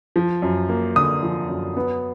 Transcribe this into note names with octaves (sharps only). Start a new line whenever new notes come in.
F3
F#2
A#3
D3 D#6
F3
F#2
B3